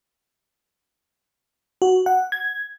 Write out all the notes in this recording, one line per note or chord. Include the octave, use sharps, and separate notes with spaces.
F#4
F#5
G#6